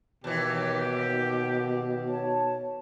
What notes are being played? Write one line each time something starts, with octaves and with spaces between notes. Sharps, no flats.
D#2 B2 E3 G4
C#5 A5